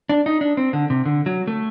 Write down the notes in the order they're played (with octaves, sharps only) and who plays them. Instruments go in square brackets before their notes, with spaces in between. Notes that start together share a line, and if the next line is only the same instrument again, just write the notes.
[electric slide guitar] D4
D#4
D4
C4
D3
C3
D3
F#3
A3